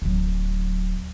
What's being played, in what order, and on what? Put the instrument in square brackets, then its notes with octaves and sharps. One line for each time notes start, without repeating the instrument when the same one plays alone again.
[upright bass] D1 F#3